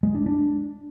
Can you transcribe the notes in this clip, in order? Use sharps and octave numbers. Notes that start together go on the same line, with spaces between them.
G#3
D4
D4